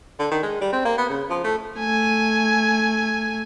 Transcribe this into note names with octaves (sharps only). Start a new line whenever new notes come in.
D3
D#3
G#3
G3
C4
A#3
B3
C#3
F3
A3
A3 G#5